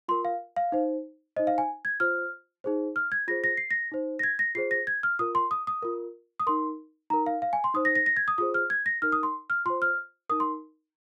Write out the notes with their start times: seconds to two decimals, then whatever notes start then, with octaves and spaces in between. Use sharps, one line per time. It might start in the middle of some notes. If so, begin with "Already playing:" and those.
0.08 F4 A#4 C6
0.25 F5
0.56 F5
0.72 D#4 C5
1.36 D#4 C5 D#5
1.47 F5
1.58 G#5
1.85 G#6
2.00 F4 C5 F6
2.64 D#4 G#4 C5
2.96 F6
3.12 G#6
3.28 F4 G#4 C5 A#6
3.44 A#6
3.57 C7
3.71 A#6
3.91 D#4 C5
4.19 A#6
4.23 G#6
4.39 A#6
4.55 F4 G#4 C5 C7
4.71 A#6
4.87 G#6
5.03 F6
5.19 F4 A#4 D#6
5.35 C6
5.51 D#6
5.67 D#6
5.83 F4 A#4
6.40 D#6
6.47 D#4 A#4 C6
7.10 D#4 A#4 A#5
7.26 F5
7.42 F5
7.53 G#5
7.64 C6
7.74 D#4 C5 D#6
7.85 A#6
7.95 A#6
8.06 A#6
8.17 G#6
8.28 D#6
8.38 F4 G#4 C5 D#6
8.54 F6
8.70 G#6
8.86 A#6
9.02 D#4 A#4 F6
9.12 D#6
9.23 C6
9.50 F6
9.66 F4 C6
9.70 C5
9.82 F6
10.29 D#4 A#4 D#6
10.40 C6